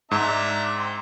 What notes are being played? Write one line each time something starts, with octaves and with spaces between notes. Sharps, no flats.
G#2 D4 E5 A#5
C4